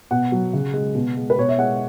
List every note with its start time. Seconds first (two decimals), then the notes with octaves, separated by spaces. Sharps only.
0.11 B2 F#5
0.32 F#3
0.53 C#3
0.74 G#3
0.95 B2
1.17 G#3
1.30 B4
1.38 B2 C#5
1.49 E5
1.58 G#3 F#5